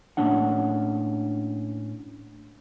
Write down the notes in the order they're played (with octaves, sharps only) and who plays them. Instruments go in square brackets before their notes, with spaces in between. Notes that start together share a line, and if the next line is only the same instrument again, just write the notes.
[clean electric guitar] A2 A#3 C#4 D4 F#5